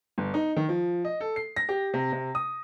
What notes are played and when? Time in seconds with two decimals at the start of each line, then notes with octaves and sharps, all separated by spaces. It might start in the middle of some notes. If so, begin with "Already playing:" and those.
0.18 G1
0.34 D#4
0.56 D#3
0.69 F3
1.05 D#5
1.20 A4
1.36 C7
1.56 A#6
1.69 G4
1.94 C3
2.12 C3
2.35 D#6